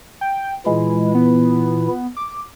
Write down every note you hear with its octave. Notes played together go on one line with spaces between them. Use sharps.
G5
A#2 E3 G#3 E4
B3
D6